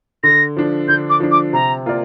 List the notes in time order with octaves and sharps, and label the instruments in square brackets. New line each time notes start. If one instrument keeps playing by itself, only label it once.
[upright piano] D3 [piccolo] A#6
[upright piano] F3 D4
[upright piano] D3 [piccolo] G6
[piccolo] D6
[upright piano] F3 D4
[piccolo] D6
[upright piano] C3 [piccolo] A#5
[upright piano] A#3 F4 A#4 D5